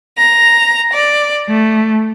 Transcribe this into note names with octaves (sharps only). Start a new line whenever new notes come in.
A#5
D5
A3